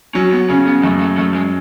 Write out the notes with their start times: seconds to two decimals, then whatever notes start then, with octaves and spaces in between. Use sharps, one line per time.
0.15 F#3 C#4
0.32 B3
0.49 C#3 C#4
0.67 B3
0.83 F#2 A3
1.00 A3
1.18 F#2 A3
1.35 G#3